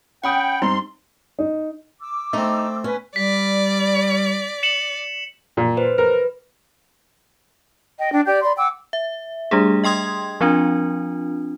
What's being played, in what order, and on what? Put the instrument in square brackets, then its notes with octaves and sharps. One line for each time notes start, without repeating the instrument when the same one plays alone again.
[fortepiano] C#4 D#6 [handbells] F#5 B5 [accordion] G5
[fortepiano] G2 C4 A#5 [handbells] D#4 [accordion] C6
[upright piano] D#4
[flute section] D6 E6
[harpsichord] A3 C4 [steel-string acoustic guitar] D#4
[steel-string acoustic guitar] C#4 [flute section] B4 G#5
[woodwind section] G3 [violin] D5 [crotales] B6
[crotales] C#7 E7 F#7
[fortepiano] A#2
[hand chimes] B4 C5
[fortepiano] A#4 [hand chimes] B4
[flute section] D#5 G5
D4 G5
G4 D5 G5 G6
D5 B5 C6
F#5 G5 D6 E6
[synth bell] E5
G3 A3 D4 G4 G#4
D#5 G5 C6 D#6 G#6
F3 C4 D4 F4